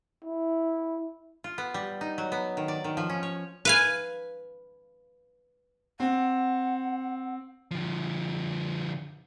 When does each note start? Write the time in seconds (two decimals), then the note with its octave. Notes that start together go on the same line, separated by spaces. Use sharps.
0.24 E4
1.44 F4
1.58 B3
1.74 G3
2.01 D#4
2.18 F#3
2.32 B3
2.57 D#3
2.68 D5
2.84 D#3
2.97 F3
3.09 C#4
3.23 C#5
3.65 B4 F5 G#5
6.00 C4 F#5
7.71 D3 F3